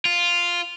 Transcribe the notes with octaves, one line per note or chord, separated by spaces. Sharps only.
F4